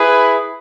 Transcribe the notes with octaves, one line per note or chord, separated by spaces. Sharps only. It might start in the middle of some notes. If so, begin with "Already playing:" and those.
Already playing: E4 G#4 B4